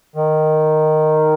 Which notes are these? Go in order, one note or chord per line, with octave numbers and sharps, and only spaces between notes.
D#3